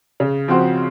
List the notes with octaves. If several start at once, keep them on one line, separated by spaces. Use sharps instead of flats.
C#3
F3 C4 F#4 C5